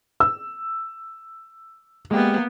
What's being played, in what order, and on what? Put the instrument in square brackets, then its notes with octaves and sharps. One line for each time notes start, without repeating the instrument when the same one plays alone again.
[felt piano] E6
[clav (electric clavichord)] G#3 G4 [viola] A#3 B3